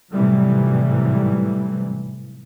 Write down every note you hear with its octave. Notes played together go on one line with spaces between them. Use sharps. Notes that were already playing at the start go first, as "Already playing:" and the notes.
G#1 A2 C3 E3 F#3 G3